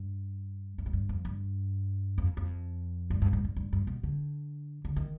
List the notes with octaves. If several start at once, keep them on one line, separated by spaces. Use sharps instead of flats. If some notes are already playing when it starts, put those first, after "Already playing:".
Already playing: G2
G2
G#2
G2
F2
G2
F2
F2
G2
G2
G#2
G2
G2
G2
B2
D3
D3
D#3